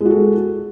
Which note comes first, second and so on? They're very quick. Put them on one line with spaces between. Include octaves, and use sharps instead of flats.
G#3 F#4 A4